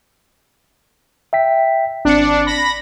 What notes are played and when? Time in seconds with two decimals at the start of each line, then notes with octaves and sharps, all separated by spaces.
1.33 E5 G5 B6
2.05 G#1 C4 D4 C#7
2.46 B5 A#6